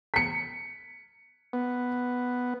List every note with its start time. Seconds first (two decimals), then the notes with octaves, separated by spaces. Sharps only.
0.14 B6 C#7
1.53 B3